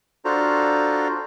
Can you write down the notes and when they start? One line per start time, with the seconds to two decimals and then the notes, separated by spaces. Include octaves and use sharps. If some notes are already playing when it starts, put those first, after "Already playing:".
0.25 D4 F4 F#4 A4 C5 A#5